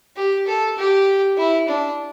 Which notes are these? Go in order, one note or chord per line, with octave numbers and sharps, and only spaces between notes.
G4
A4
G4
E4
D4